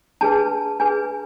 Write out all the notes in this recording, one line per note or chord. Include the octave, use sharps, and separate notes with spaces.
D4 G#4 B4 A5
D4 G#4 B4 G#5